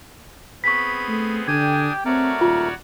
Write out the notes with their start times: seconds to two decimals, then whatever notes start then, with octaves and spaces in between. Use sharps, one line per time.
0.64 B3 C4 G#4 B5 C#6 B6
1.09 A3
1.47 D3 D4 G4 G5 G#5 D#6 G#6
2.05 A3 C4 F#4 A#4 C#5 D5
2.41 D#1 F4